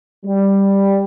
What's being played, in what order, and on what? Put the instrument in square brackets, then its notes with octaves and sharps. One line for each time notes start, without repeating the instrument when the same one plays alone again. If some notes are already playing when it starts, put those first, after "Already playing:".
[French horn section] G3